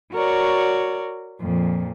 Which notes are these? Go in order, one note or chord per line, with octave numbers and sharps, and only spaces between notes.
F#4 A#4 C#5 D5
F2 A#2